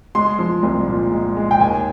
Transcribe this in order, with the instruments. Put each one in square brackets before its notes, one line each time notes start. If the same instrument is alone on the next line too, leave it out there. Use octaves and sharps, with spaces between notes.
[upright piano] G#3 C6
F3
C2
A#2
G#3
G#3
G5
D#2 G#5